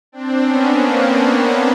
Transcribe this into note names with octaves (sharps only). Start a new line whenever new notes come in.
C4 D4
B3 C#4
A#3 C4